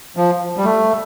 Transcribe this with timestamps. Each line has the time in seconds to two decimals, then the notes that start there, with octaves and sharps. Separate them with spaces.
0.17 F3
0.57 G3
0.64 A3